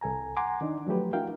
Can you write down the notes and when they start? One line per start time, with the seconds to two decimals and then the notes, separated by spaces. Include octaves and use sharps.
0.01 C2 A4 G#5 A#5
0.37 F#5 G#5 A#5 C6 D6
0.61 D#3 D4 D#4
0.87 F3 F#3 A3 G4 B4
1.13 D4 E4 F#4 A#4 F5 G5